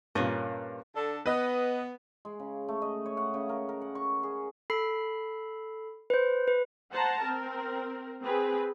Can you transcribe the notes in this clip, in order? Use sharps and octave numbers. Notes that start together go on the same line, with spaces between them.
G2 A#2 A#3 C#4 D#5
D3 D4 A4
B3 B4 D#5
G#3
C#3
A3
D#5
C#5
F#5
C#3
A#4
A#4
F#5
C#6
G#4
A4 B5 C7
B4 C5
B4
C5 F#5 A5 A#5
C4 A#4
C4 G#4 B4